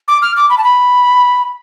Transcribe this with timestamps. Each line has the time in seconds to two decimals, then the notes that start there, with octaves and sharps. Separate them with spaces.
0.08 D6
0.22 F6
0.36 D6
0.50 B5
0.58 A5
0.63 B5